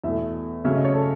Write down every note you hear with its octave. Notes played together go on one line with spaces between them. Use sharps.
E2 B2 A3 E5
C#3 F#3 A3 C#4 E5
D#5
C#5
A4